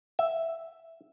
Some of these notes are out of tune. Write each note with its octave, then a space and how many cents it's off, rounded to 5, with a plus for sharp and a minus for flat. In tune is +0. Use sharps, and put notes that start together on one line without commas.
E5 +0